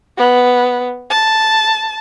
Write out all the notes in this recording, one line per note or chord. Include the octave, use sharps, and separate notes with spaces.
B3
A5